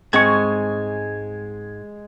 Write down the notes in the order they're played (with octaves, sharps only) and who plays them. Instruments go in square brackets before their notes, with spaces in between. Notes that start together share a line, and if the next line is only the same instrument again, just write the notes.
[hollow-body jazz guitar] G#2 C4 [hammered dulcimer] G#3 G#5 [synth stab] C#6 G#6